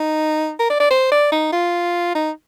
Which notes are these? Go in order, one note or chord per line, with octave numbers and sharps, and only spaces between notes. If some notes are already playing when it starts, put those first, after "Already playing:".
Already playing: D#4
A#4
D5
D5
C5
D5
D#4
F4
D#4